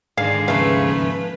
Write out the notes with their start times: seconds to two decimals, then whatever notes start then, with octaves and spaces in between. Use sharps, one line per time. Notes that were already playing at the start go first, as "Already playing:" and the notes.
0.17 G#2 D3 D#3 G#4 F5
0.48 D#2 C#3 F3 A3 B4 E5 F5